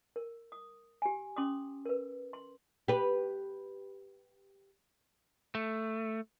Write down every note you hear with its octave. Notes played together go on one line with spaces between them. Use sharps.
A#4
D#6
G4 G#5
C#4 C6 D6 D#6
A#4 B4
C6
G4 B4
A3